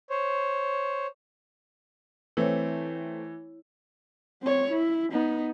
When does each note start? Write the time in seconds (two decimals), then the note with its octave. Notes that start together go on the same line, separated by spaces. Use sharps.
0.10 C5 C#5
2.37 E3 A3 C4 E4 C#5
4.42 C4 C#5
4.71 E4
5.12 B3 D#4